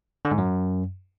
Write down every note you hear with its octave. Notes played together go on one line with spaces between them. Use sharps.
D3
G#2
F#2